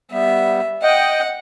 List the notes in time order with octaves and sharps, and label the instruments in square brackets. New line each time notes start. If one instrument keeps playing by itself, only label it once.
[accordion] G3 B3 [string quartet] E5
[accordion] D#5 G5 [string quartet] F#5